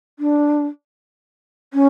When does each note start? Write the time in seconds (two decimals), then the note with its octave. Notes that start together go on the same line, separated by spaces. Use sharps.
0.19 D4
1.74 C#4